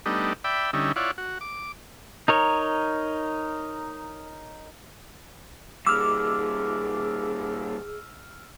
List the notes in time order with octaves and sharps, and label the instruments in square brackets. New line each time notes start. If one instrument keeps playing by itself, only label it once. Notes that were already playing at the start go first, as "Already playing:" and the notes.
[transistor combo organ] G3 A3 B3 D4 D#4
D5 E5 G5 B5
D3 G3 C#4 D#4 E4
E4 F4 C#5 D5 F#5
F#4
D6
[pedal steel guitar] D#4 A#4 C#5
[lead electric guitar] A#2 G3 [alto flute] G#4 [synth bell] D6 [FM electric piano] E6 F6